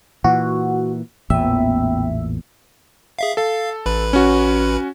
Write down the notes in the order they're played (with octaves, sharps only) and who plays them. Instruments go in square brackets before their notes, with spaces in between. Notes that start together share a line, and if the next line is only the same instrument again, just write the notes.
[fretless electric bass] A#2 E3 [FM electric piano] F#4
[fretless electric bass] A1 E2 A#2 [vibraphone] B3 G5 [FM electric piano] E5
[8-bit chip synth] G#4 E5 F5
[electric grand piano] A4 [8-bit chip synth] F5
[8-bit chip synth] A1 B4 B5
[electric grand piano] C#4 F#4